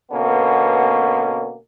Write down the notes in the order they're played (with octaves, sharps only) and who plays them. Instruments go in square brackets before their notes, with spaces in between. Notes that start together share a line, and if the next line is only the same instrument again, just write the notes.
[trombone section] B2 D3 A#3 B3 C#4